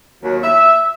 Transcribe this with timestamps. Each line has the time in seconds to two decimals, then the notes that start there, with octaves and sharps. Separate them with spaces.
0.23 D#2 F#3
0.43 E5 E6